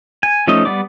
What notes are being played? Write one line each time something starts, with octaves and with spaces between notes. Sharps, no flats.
G#5
F3 A3 C#4 D#4 D#5
G3 B3 D5 D6